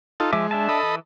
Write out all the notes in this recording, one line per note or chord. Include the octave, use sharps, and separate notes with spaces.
D#4 F4 A4
F3 G#3 E5 D6
D4 E5 A5
A4 D#5 B5
E3